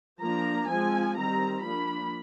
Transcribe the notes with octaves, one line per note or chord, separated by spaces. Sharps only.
F3 A#3 D4 A#5
F3 G#3 C4 G#5
D#3 G3 C4 A#5
F3 A#3 D4 B5